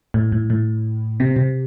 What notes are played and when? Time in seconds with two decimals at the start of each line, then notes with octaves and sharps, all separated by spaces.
0.14 A2
0.32 A2
0.50 A2
1.20 C3
1.36 C3